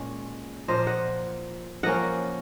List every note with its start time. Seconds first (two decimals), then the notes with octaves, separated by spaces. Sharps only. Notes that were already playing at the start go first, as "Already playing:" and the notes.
Already playing: A#2 G#3 C#4
0.68 A#2 F3 A#3 C5 D#5
0.87 D#5 F#5
1.83 F3 A#3 C#4 D#5 F#5